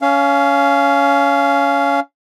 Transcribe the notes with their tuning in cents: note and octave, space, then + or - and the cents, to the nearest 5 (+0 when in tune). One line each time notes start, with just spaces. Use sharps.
C#4 +20 F5 -15